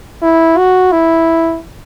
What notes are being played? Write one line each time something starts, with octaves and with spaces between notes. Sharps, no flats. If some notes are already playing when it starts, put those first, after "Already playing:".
E4
F#4
E4